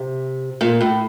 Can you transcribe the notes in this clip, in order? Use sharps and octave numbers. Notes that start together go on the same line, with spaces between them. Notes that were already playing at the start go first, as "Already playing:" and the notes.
Already playing: C3
A#2
A2